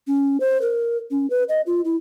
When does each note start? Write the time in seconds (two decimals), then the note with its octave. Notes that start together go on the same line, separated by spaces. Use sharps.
0.07 C#4
0.40 C5
0.62 A#4
1.11 C#4
1.30 B4
1.49 D#5
1.67 F4
1.85 E4